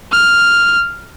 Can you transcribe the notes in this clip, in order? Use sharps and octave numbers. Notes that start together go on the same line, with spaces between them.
F6